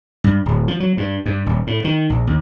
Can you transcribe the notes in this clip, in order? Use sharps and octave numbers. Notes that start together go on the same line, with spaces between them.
G2
D1
F3
F#3
G2
G2
D#1
A2
D#3
A#1
D#2